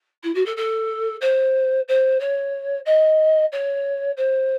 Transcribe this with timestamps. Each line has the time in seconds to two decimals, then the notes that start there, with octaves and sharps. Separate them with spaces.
0.23 E4
0.34 F#4
0.45 A4
0.56 A4
1.21 C5
1.88 C5
2.20 C#5
2.85 D#5
3.52 C#5
4.17 C5